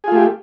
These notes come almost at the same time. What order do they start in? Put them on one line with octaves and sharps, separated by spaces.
G#4 F4 A3 G4